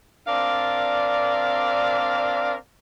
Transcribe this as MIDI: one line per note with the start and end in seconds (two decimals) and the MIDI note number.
0.27 2.54 60
0.27 2.54 62
0.27 2.54 70
0.27 2.54 74
0.27 2.54 77